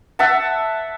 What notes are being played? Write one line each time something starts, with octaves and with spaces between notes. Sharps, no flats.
E5 F#5 A5